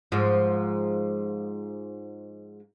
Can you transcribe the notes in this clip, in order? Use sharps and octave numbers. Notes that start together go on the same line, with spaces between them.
G#2 F3